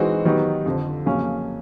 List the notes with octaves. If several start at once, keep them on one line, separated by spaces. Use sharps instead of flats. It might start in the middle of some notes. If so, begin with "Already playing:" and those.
Already playing: E3 G#3 C4 D#4 F#4
D#3 F#3 B3 D#4 G4
F2 D3 F3
F2 C#3 F#3 A#3 C#4